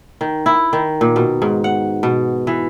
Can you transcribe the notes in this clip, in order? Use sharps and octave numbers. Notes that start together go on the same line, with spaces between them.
D#3
E4
D#3
A#2
B2
G#2
F#5
B2
E3